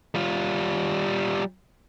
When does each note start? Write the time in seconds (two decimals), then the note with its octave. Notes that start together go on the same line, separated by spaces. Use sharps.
0.15 G3 F4